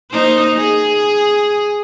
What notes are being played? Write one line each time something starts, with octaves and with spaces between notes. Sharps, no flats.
A#3 D#4 C5
G#4